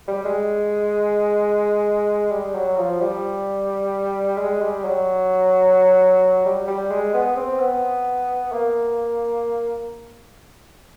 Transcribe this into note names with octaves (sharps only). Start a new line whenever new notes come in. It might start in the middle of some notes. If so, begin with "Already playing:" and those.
G3
G#3
G3
F#3
F3
G3
G#3
G3
F#3
G3
G3
G#3
B3
C4
B3
A#3